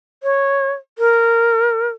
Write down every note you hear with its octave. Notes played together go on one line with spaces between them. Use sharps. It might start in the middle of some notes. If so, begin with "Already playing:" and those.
C#5
A#4